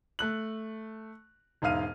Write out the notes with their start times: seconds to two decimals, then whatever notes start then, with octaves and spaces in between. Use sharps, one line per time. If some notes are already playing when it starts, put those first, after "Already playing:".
0.19 A3 F#6 F#7
1.62 E1 G#2 E5 F5 F6 D#7